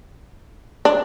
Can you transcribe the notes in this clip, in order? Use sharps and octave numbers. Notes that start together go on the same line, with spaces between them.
D4